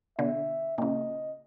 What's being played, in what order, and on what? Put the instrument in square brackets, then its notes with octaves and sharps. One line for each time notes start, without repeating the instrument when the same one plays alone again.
[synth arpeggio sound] B2 D3 [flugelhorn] E5
[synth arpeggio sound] A#2 C#3 [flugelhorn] D#5